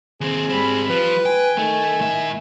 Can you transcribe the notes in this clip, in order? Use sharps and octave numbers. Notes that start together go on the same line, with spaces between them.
D#2 C4 G#4
G#2 G3 C4 B5
F3 B4
G5 G#5
D#3 A3 A4
A2 E5